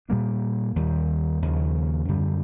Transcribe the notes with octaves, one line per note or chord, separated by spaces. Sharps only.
A#2 G3 A#3 D4
D#2 D#3 G3
D#2 C#3 F3
F#2 D3 G3